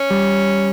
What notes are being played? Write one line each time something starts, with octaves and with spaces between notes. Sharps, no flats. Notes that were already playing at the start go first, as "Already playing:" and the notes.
Already playing: C#4
G3